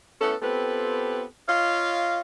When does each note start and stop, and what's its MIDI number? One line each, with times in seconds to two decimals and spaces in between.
0.21 0.35 57
0.21 0.35 59
0.21 0.35 61
0.21 0.35 64
0.21 0.35 69
0.42 1.25 59
0.42 1.25 60
0.42 1.25 65
0.42 1.25 67
0.42 1.25 69
0.42 1.25 71
1.49 2.20 65
1.49 2.20 73
1.49 2.20 75
1.49 2.20 77